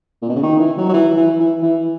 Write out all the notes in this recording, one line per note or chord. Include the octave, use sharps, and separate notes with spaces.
A#2
B2
C#3
D#3
E3
F#3
F#3
E3
E3
E3
E3